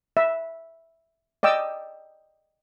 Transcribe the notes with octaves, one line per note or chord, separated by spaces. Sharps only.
E5
D5 D#5 G5 D6 E6